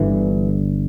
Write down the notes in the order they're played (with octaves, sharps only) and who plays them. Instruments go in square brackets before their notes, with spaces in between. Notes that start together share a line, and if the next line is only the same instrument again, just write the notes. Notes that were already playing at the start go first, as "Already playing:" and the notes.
Already playing: [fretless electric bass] G1 G2 D3 E3